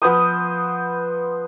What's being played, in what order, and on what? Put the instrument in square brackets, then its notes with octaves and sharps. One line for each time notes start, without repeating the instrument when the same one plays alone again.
[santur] F3 B3 C5 D#6